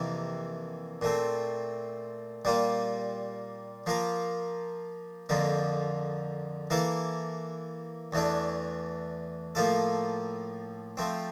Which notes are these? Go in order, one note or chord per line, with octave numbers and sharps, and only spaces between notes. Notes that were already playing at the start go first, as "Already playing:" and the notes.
Already playing: F2 C3 E3 A#3 E4
A#2 A3 C4
A#2 G3 A#3 F4
F3 A#3 F4 A#4
F2 D3 F3 A#3
E3 A#3 E4 A4
E2 E3 A3 D4
A2 F3 A#3 F4 A4
F3 A3 C4